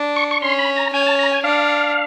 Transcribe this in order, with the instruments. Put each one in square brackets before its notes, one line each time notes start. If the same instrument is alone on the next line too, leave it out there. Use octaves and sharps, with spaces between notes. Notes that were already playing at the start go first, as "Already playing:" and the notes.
Already playing: [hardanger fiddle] D4
[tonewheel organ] C#6
C#6
[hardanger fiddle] C#4 [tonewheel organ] C6
[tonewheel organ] B5
A#5
[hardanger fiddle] C#4 [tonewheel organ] G#5
[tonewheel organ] A5
A#5
G#5
[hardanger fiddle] D4 [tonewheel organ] F5